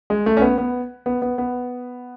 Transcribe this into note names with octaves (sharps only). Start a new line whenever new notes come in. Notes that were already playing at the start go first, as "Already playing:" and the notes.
G#3
A3
C#4
B3
B3
B3
B3
B3